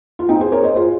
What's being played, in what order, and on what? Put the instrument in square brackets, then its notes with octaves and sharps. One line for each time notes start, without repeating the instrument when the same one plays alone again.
[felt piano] F4
C4 D#4
G#4 C5
A#4 C#5
C5 D#5
F4 G#4